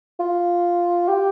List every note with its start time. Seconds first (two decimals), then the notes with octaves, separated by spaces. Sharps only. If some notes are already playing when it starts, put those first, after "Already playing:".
0.19 F4
1.08 G4